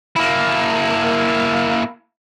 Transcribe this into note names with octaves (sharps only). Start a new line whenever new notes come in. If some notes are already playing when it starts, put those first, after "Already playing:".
A#3 E4